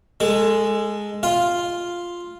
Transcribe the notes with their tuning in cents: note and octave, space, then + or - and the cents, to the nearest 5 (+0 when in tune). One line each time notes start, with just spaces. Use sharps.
G#3 +0 A4 +25
F4 +0 F5 +0